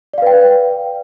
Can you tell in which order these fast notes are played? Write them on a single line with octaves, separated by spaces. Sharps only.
D5 F5 B4 G5